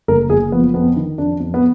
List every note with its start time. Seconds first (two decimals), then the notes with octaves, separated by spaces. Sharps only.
0.08 F#1 A#4
0.30 F#1 G#4
0.52 F3 B3
0.74 F2 B3
0.96 D#3
1.18 F2 D4
1.40 F2
1.54 B3